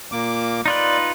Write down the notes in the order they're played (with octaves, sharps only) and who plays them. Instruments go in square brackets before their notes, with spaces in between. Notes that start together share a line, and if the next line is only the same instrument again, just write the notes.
[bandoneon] A#2 A#3 D6
[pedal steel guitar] D#4 F4 B4 [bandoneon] D5